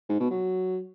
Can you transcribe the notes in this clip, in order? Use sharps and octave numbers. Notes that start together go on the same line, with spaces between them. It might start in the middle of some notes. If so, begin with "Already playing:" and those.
G#2
B2
F#3